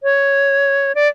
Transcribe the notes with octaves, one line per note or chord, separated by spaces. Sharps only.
C#5
D5